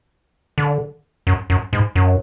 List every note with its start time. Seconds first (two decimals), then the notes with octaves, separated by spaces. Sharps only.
0.58 D3
1.27 F#2
1.50 F#2
1.73 G#2
1.96 F#2